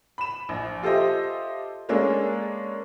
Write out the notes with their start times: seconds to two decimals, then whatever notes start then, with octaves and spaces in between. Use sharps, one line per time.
0.18 B5 E7
0.49 A#1
0.83 F4 G4 A4 C5 D#5 E5
1.89 G#3 A#3 C#4 D4 A4